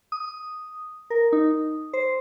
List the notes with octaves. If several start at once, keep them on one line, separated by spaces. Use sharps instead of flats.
D#6
A#4
D#4
C5